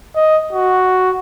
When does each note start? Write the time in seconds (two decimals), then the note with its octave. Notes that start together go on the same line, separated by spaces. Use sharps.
0.16 D#5
0.53 F#4